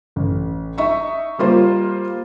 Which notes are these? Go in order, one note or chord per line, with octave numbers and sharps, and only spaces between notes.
A1
D#4 D#5 E5 C#6
G3 A#3 F4 C5